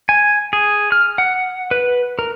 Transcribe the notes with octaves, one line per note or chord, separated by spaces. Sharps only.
G#5
G#4
F6
F#5
B4
A#4